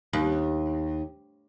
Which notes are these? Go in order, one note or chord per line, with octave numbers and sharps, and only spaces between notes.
D#2